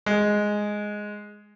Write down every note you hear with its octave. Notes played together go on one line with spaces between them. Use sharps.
G#3